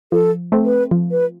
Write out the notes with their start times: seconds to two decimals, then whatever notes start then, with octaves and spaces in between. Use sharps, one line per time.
0.12 F3 A4
0.52 A3 C4
0.65 B4
0.91 F3
1.11 B4